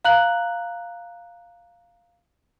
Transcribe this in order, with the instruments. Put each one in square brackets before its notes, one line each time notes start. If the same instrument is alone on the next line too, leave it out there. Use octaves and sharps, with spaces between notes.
[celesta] F5 A#5 F#6 F#7